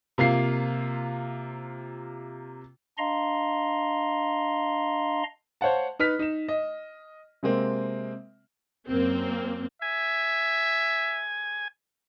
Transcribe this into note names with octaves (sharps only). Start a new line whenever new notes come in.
C3 A#3 F4 C7
D4 D#5 F5 A#5 C6
C5 C#5 F5 F#5 A5
D#4 B4 F6 B6
D#4 E7
D#5
C3 G#3 A#3 C4
F#2 A#3 C4
E5 G#5